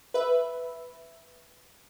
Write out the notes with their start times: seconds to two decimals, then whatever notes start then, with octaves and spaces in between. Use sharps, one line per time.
0.14 B4 E5